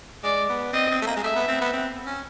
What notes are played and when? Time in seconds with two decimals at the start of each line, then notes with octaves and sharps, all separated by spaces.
0.23 G#3 D5
0.49 B3
0.73 C4 D#5
0.91 C4
1.02 A3
1.06 A#3
1.16 G#3
1.23 A3 E5
1.36 B3
1.48 C4
1.61 B3
1.73 C4
2.06 C#4